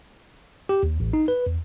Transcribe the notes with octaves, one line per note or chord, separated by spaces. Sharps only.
G4
D#2
A1
D#4
B4
E2